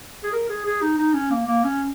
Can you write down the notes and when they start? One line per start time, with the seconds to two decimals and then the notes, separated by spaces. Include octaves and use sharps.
0.23 G#4
0.33 A#4
0.49 G#4
0.66 G#4
0.82 D#4
0.98 D#4
1.14 C#4
1.30 A#3
1.47 A#3
1.64 C#4